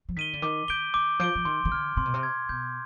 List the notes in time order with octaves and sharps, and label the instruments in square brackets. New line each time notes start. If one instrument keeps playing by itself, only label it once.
[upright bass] F3
[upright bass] D#3 [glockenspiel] B6 D#7 G7
[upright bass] D3
[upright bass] D#3 [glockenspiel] D6
[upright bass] D#3 [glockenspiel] G6 D7 G7
[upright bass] D#3 [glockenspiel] D6
[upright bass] F3 [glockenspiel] G6 D7 G7
[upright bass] F3
[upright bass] D#3 [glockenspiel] C6
[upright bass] D#3
[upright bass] D3 [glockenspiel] F6 G#6
[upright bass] C3 [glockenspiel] C6
[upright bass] B2
C3
[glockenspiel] F6 G#6
[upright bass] B2 [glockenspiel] G6